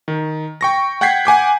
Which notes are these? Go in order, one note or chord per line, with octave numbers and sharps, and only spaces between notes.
D#3
G5 C#6 A#6
F#5 G5 G6 G#6 B6 C7
F#5 G#5 D6 G6